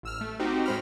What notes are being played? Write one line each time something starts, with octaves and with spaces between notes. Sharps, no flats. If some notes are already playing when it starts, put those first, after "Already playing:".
A1 E6 F6
A3
C4 D#4 F#4 G4
A2 G#3 C5 B5 F6